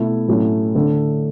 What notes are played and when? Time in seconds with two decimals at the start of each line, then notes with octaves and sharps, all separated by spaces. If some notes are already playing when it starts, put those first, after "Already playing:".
Already playing: B2 A3 E4
0.28 A2 F#3 A3 C#4 E4
0.75 D3 A3 D4 A4